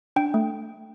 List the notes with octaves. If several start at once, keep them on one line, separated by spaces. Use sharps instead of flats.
D4 G5
A3